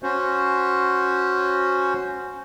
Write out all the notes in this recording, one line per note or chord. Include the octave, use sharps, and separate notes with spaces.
C#4 F#4 C5